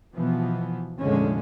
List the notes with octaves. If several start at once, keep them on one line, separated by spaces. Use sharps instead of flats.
B2 E3 F3 B3
F1 A#2 D3 F3 G#3 C#4